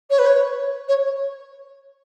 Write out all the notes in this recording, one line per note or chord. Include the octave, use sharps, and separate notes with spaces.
C#5
B4
C#5
C#5